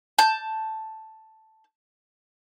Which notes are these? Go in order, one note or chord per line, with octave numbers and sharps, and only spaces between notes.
A5 G6